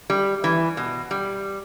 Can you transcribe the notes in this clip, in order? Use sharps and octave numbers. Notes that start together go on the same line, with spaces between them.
G3
E3
B2
G3